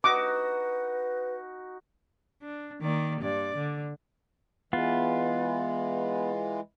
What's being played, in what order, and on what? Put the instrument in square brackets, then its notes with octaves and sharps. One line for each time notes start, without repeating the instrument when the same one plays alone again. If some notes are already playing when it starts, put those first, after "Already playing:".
[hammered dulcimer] D#4 F#4 [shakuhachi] B4 [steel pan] D6
[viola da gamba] D4
D#3 A#3 D5
G2 D5
D3
[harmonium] E3 G#3 [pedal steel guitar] B3 [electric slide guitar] F4